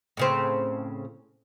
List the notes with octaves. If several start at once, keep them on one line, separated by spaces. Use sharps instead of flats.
A2 C#3 C4